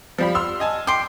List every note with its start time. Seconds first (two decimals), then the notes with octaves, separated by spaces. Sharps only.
0.18 F3 G3 B5
0.35 C6 E6 F6
0.60 D#5 G#5 A5
0.87 G5 C6 D6